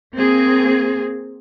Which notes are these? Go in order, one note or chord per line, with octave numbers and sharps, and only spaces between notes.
A#3 C4 G#4